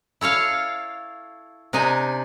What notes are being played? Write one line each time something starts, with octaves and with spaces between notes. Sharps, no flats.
E4 A4 C#5 F5
C3 D4 D#4 G#5